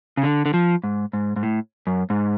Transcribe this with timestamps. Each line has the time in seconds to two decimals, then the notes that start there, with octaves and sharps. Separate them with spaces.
0.17 C#3
0.23 D3
0.46 D3
0.54 F3
0.84 G#2
1.13 G#2
1.36 G#2
1.43 A2
1.87 F#2
2.10 G#2